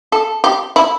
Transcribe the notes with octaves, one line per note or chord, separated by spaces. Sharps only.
A4
G4
E4